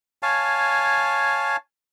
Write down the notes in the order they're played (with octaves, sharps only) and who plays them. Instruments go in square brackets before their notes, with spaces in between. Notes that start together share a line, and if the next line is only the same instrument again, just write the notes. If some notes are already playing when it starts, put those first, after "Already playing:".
[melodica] C#5 F5 G#5 A5